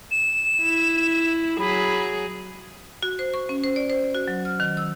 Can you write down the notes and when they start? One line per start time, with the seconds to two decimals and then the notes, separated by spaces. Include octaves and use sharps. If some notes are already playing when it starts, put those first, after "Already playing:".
0.11 E7
0.63 E4
1.59 F#3 G#4 B5
3.03 F#4
3.19 C5
3.34 C#6
3.49 C#4
3.63 C5
3.76 D5
3.90 C5
4.15 F#4
4.28 F#3
4.45 F6
4.60 D#3
4.77 E6